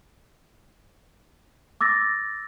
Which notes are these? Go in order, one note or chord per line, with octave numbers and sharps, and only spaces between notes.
D6 E6 A6 A#6